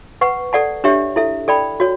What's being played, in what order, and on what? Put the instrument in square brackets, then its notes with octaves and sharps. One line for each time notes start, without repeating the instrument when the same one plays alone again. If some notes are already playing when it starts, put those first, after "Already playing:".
[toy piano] B4 F#5 C#6
A4 D5 F#5 A5
D4 G4 C#5 E5
E4 A4 E5
A4 D5 G5 B5
F#4 C#5